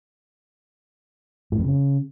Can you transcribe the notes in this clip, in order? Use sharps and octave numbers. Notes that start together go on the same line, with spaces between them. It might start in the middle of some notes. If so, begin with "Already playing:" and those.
A2
F2
C#3